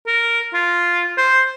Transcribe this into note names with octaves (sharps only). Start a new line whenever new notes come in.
A#4
F4
C5